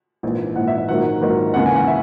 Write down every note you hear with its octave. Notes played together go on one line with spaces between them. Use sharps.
A#1 G#2 E3
A#1 G#2 E3 F#5
E5
E5
A#1 G#2 D#3 F#3 A#3 F#5
A#1 G#2 D#3 F#3 A#3
D#2 C#3 E3 G#3 F#5
G#5
F#5
E5